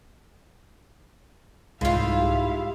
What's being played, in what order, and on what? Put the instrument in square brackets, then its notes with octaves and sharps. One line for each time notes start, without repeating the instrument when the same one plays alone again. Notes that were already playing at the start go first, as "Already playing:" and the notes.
[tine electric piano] C2 [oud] G#2 F4 [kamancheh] E4 F5
[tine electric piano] G4